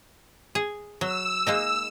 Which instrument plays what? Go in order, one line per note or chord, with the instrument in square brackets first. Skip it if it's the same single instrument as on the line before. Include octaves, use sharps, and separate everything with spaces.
[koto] G#4
[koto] F#3 [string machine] E6
[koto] G#3 A#3 D#4